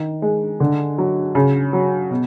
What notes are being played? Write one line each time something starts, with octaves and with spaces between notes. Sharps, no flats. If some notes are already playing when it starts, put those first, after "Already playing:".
Already playing: D#3
G#3
D3
F#3
C#3
F#3
B2